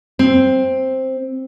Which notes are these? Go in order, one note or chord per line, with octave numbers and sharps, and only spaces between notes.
C4